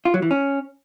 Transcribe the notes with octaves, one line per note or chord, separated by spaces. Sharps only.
F4
F#3
E3
C#4